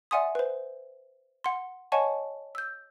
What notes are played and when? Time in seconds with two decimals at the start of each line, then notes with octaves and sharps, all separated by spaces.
0.11 D5 E5 F#5 G#5 C6 D#6
0.35 B4 C5
1.44 F#5 C6
1.92 C#5 D#5 F#5 G#5 A5 C#6
2.55 E6 G6